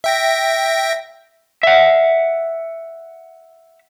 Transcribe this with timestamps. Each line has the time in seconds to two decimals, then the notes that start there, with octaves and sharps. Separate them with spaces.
0.04 E5 G5 A#6
1.63 E5 F#5